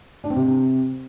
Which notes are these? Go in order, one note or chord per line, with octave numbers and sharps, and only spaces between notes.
D4
C4
C3